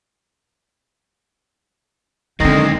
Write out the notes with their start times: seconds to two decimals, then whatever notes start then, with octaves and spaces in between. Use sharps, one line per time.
2.40 F#2 D3 D#3 G#3 C4 D#4 D#5